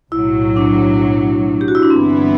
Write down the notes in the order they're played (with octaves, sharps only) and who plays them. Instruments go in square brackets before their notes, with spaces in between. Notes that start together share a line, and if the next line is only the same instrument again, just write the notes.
[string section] B1 A2 F#3 [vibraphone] E4
[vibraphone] D4
G4
F#4
E4
D4
[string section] G1 G2 E3 B3 E4 [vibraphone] C4